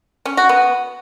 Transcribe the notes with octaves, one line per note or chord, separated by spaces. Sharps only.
C#4
F#4
B3